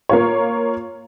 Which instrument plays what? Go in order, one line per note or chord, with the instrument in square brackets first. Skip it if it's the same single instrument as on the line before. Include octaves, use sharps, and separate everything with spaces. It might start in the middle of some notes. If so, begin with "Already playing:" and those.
[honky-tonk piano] A#3 F4 C#5